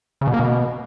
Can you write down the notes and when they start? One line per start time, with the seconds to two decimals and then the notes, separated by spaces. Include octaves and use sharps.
0.21 C#3
0.27 B2
0.33 A#3
0.40 B2